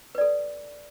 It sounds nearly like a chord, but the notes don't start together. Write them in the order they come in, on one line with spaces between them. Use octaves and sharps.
B4 D5 A4